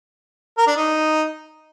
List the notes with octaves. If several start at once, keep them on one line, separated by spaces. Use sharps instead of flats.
A#4
D4
D#4